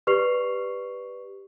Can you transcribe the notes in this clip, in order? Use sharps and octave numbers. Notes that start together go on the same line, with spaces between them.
G4 B4 D5 C#6 C7 F7